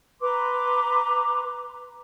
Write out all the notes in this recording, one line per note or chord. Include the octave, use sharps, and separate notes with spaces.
B4 A#5 C6 D6